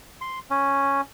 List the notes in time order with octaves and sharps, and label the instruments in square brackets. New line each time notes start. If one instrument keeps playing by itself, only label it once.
[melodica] C6
C#4